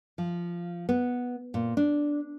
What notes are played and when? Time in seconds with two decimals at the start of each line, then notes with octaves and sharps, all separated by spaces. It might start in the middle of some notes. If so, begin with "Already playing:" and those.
0.18 F3
0.89 B3
1.54 A#2
1.77 D4